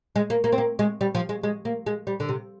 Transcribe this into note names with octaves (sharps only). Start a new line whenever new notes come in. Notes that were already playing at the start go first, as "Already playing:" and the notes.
G#3
A#3
A#3
C4
A#3
G#3
G3
F3
G#3
G#3
A#3
G#3
G3
D3
C3